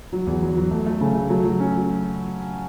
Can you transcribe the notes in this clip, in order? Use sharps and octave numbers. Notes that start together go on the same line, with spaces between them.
F#3
E2
F#3
F#3
A3
A3
C#3
A3
F#3
F#3
C#4